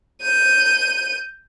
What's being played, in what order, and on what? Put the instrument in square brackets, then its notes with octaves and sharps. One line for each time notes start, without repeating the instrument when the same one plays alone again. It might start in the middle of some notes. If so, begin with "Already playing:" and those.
[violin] G6 D#7